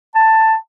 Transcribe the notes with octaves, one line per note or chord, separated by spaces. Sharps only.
A5